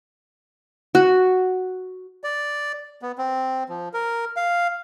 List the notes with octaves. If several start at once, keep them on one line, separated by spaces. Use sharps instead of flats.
F#4
D5
B3
C4
F3
A#4
F5